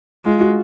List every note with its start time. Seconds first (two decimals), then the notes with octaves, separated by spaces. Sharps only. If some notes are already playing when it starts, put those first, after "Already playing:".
0.25 G#3 F4
0.41 F#4